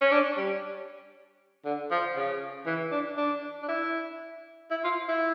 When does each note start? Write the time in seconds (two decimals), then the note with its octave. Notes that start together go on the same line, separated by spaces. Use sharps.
0.01 C#4
0.11 D4
0.37 G3
1.65 D3
1.91 F3
2.16 C#3
2.66 E3
2.92 D4
3.17 D4
3.62 D4
3.68 E4
4.71 E4
4.84 F4
5.09 E4